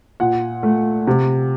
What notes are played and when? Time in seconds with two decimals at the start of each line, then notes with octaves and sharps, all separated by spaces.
0.20 A#2 F#5
0.63 A3
1.07 C3